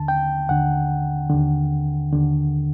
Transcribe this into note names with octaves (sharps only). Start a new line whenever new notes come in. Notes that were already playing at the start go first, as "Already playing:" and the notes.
Already playing: D#2 D3 A5
G5
D#2 D3 F#5
D#2 D3
D#2 D3